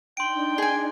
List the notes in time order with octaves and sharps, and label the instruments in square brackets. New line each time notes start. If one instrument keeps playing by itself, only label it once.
[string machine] D4 D#4 [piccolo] G5 [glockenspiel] C6 D7
[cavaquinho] G#4 G#5